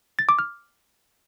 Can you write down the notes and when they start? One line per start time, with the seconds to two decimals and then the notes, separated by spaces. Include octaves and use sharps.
0.19 A6
0.29 D6
0.39 F6